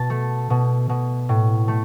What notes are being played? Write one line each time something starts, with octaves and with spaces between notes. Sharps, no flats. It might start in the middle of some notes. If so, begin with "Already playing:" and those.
Already playing: B2 A5
A3
B2
B2
A2
A3